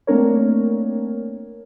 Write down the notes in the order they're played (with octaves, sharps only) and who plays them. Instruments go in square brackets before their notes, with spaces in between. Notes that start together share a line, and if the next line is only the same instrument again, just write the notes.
[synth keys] A3 A#3 C4 D4 A#4 C#5